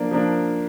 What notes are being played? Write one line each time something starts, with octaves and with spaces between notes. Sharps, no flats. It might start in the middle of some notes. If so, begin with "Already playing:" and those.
Already playing: F3 A#3 D4
F3 A#3 D4